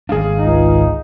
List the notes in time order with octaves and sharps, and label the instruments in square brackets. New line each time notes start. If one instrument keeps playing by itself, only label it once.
[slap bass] G#1 G#3 D4 [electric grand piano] G#4 F5
[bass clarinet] C#2 [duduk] D#4